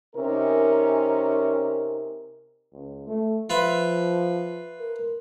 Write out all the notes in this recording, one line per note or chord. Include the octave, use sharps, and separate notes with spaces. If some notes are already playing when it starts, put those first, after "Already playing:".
C3 C#4 D#4 A#4
C#2
A3
F3 F4 B4 E5
A#4